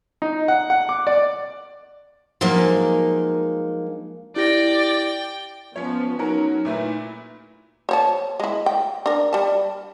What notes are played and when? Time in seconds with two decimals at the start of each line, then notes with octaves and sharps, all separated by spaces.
0.22 D#4
0.48 F#5
0.70 F#5
0.89 D6
1.07 D5
2.41 F3 F#3 G#3 A#3 D#4
4.36 E4 G4 D5 G5 A#6
5.76 F3 B3 C#4 C#5
6.19 F#3 C#4 D#4 F#4 A#4
6.65 A#2 A3 E4 B4
7.89 C5 C#5 A5
8.40 G#3 E4
8.66 G5
9.06 D4 A#4
9.33 G3 A5